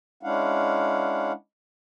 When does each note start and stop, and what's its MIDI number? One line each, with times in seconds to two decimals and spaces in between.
0.23 1.32 56
0.23 1.32 61
0.23 1.32 62
0.23 1.32 64
0.23 1.32 77
0.23 1.32 78